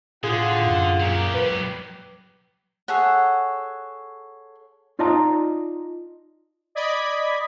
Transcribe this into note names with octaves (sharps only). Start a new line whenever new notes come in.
A2 D3 F4 G#4 F#5
F#2
A#2 F#3 A#3 G4
B4
G#4 A4 C#5 F#5
D#4 F4 D5 D#5 A5 A#5
D5 D#5 B5 G#6 B6